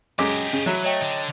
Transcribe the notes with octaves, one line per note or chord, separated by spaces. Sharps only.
F#2 G#3 G4 G#4 D#5 D6
C#3
E3 F#3 E5
A3 C#5 D#5 G5
D3